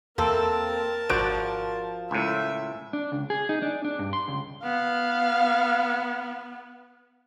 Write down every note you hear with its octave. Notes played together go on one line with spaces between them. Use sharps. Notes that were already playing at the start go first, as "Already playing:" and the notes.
E2 A#3 C4 A4 A#4 A5
G#1 F3 D4 F#4 D7
C#2 A2 E5
D4
C#2
G#4
D#4
D4
D4
G2
C6
C#2
B3 F5